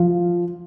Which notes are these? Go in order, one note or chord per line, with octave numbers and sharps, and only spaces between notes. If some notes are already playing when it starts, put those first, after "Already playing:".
Already playing: F3